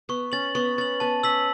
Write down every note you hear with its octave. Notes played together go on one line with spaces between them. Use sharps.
B3 C#6
C#4 A6 F#7
B3 C#6
C#4 A6 F#7
B3 A5
C#4 E6 B6 F#7